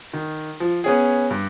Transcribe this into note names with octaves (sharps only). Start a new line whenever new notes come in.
D#3
F3
B3 C#4 G#4
G2